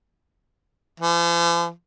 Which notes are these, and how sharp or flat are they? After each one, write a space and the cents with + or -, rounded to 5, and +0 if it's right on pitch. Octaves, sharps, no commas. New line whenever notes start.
F3 -45